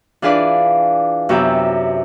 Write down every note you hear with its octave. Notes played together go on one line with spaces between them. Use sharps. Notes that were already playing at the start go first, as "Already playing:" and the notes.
E3 D4 F4 G#4 B4 D5
F#2 C3 B3 G4 E5